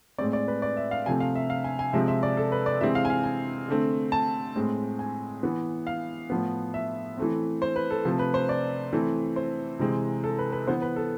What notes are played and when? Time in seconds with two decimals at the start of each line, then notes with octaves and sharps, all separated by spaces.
0.18 A2 G#3 C4 D5
0.33 D5
0.48 B4
0.62 D5
0.77 E5
0.91 F5
1.06 C3 F3 A3 C4 G#5
1.20 F5
1.35 E5
1.50 F5
1.64 G#5
1.79 G#5
1.93 C3 F3 G#3 C4 E5
2.08 E5
2.23 D5
2.37 A4
2.52 B4
2.66 D5
2.81 C3 E3 G#3 C4 E5
2.95 F5
3.05 G#5
3.10 F5
3.24 G#5
3.68 D3 A3 C4
4.12 A5
4.56 A2 G#3 C4
4.99 G#5
5.43 E3 B3
5.87 F5
6.30 A2 F3 B3
6.74 E5
7.18 E3 A3 C4
7.62 C5
7.76 B4
7.91 A4
8.05 C3 F3 A3 C4 A4
8.19 B4
8.34 C5
8.49 D5
8.93 E3 A3 C4
9.36 C5
9.79 C3 E3 G#3 C4
10.24 A4
10.38 B4
10.52 B4
10.67 E3 B3 C5
10.82 B4
10.96 A4